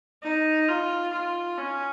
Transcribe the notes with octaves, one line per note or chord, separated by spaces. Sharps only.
D#4
F4
F4
C#4